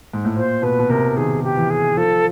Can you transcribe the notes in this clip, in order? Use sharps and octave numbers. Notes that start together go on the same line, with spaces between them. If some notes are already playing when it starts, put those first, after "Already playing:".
G#2
A2
A#2 C5
B2 B4
B2
C3 A#4
D#3 G#4
G4
E3
G#4
F3 A4